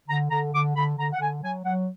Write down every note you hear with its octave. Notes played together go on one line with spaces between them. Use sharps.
D3 A#5
D3 A#5
D3 D6
D3 B5
D3 A#5
F#5
D3 G#5
F#3 G#5
F#3 F#5